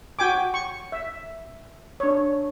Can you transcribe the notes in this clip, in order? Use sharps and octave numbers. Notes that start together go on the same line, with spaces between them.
F#4 G5 G#5 D6
C#6
E5
D4 C#5